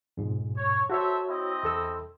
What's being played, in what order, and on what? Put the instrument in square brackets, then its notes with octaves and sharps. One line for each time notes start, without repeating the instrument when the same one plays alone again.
[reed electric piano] F2 G#2 B2
[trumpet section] C#5
[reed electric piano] F#4 C#5 [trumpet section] A4 C5 E5
[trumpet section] C4 E4 D#5
[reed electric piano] E2 A4 E6